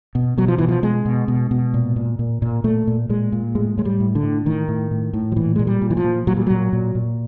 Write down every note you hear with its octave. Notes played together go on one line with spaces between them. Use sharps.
B2
B2 F#3
F3
B2 E3
F3
B2 G#3
B2
B2
B2
A#2
A#2
A#2
A#2
A#2 A3
A#2
A#2 G#3
A#2
A2 G#3
A2 G#3
G3
A2
D3
A2
A2 D#3
A2
A2
A2
F3
A#2 E3
A#2 G#3
G3
A#2
E3
F3
A#2
A#2 F#3
G3
A#2 F#3
A#2
A#2